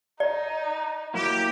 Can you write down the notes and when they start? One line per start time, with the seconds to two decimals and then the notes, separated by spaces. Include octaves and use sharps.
0.20 D#4 D5
1.14 F#3 A#3 E4 G4